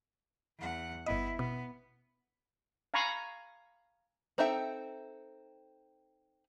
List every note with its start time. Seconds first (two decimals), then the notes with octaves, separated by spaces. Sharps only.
0.59 E2 F#5
1.06 G1 B3 E4 D#5
1.39 B2 B3
2.94 F5 G#5 A#5 B5 C#6
4.38 C4 D#4 A4 E5 G5